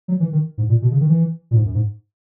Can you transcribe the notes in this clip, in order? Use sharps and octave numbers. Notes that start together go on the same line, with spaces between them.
F#3
E3
D#3
G#2
A#2
B2
C#3
D#3
E3
A#2
G#2
F#2
G#2